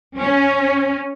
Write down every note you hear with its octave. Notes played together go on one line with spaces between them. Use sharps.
C#4